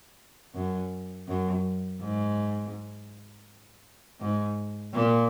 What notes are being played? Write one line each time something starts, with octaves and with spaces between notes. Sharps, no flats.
F#2
F#2
G#2
G#2
A#2